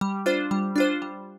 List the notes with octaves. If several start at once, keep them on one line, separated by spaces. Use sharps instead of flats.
G3
D4 F4 C5
G3
D4 F4 C5
G3